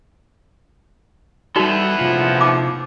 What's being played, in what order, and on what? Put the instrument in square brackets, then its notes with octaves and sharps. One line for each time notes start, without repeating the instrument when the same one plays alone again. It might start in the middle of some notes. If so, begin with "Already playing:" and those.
[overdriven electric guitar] E3 B3 [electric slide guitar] G3 A4 [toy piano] D#4 F#4 D5
[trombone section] A#1 A2 F3 [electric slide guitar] C3 F4
[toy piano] D#4 D6